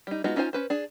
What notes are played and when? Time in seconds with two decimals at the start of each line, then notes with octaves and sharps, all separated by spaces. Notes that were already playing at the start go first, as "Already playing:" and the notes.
0.07 G3 D#4
0.24 G#3 B3 D#4 F4 F#4
0.36 C#4 D#4 F4 C5 G#5
0.53 C#4 B4 C5
0.70 D4 G#4